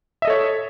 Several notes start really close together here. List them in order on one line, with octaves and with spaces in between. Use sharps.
E5 D#5 A4 C#5